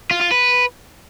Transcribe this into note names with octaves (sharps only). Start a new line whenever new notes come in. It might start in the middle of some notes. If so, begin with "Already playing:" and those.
F4
F4
B4